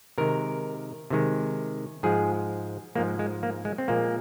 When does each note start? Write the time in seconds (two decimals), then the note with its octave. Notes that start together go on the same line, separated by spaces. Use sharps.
0.18 C3 D#3 G#3 A#4
1.10 C3 D#3 G#3
2.03 G#2 F3 G#3 G#4
2.95 G#2 F3 G#3 A#3
3.19 G#3
3.43 A#3
3.65 G#3
3.78 C4
3.88 A#2 F3 G#3 A#3